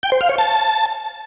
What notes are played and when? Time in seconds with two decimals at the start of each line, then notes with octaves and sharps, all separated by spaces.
0.03 G5
0.12 C5
0.21 F5
0.30 C#5
0.38 A5